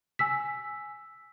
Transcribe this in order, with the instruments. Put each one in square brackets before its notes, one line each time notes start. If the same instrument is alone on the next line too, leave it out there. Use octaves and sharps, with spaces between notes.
[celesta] G#5 E6 B6